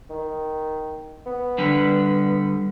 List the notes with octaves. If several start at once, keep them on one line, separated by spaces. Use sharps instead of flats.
D#3
B3
D3 G3 B4